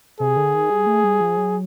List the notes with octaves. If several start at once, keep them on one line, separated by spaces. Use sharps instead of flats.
C3 G#4
D3
D#3
G3
A3
G3
F3
F#3